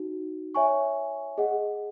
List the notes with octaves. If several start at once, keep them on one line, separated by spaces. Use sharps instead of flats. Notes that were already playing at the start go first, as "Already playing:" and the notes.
Already playing: D#4 F#4
C#5 E5 G#5 C#6
G#4 D#5 F#5